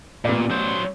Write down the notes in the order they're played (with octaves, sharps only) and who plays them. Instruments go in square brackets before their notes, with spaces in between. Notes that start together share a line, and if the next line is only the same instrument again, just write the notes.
[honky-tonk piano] A1 B3 D5 [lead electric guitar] A#2
[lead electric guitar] F#3 C5